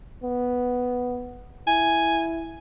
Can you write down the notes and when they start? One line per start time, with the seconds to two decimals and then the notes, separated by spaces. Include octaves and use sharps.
0.23 B3
1.67 E4 G#5